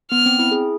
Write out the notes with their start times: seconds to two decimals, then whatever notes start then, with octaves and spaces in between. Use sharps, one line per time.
0.11 B3 F6
0.26 C4
0.39 E4
0.51 G#4